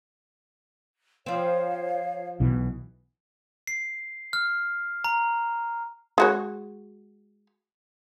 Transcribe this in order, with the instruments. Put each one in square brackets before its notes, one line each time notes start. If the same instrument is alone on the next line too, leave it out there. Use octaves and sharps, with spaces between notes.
[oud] F3 C4 [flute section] C#5 F5
[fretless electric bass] B1 B2 E3
[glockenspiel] C7
F6
A#5
[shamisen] G#3 F#4 C#5